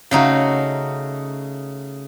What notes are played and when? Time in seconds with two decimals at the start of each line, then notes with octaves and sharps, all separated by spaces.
0.11 C#3 A3 D#4 F#4